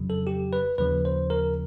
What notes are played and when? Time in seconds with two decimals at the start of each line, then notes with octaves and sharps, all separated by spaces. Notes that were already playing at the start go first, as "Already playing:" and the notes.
Already playing: F2 C#3 F#3
0.10 A4
0.27 G4
0.53 B4
0.78 D#2 C#3 F3 B4
1.05 C5
1.30 A#4